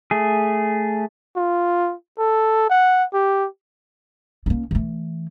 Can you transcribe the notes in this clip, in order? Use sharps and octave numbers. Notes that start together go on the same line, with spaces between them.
A3 G#4
F4
A4
F#5
G4
A#3 C#4
E3 A3